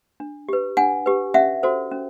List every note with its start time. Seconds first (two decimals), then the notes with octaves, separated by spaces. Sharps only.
0.20 D4
0.49 G4 B4
0.77 D4 F#5 G#5
1.06 G4 B4
1.34 C#4 E5 F#5
1.63 F#4 A4 C5
1.91 C#4